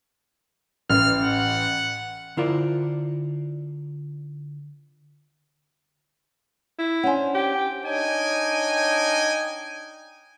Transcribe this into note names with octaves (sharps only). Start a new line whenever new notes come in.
A1 F6
F#5
D3 E4 F4 A#4 C5 D5
E4
C#4 D4 C5 F#5 G#5
G4
D4 D#4 C#5 G5 G#5